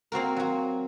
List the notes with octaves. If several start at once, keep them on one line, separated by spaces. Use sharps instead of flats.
A#3 C4 F#4 A#4
F#3 F#4